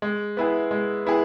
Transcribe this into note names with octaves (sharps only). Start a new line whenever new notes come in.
G#3
B3 E4 G#4
G#3
B3 E4 G#4